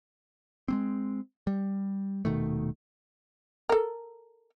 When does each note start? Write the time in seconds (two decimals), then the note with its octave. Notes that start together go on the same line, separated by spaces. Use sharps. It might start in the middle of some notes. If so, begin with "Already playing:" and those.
0.68 G#3 A#3 C4
1.47 G3
2.25 D#1 B2 D#3 A3
3.69 A4 A#4